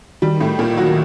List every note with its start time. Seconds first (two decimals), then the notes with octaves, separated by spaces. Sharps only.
0.22 D#3 G3
0.40 A2 A3
0.59 A#2 A#3
0.77 F#3 F#4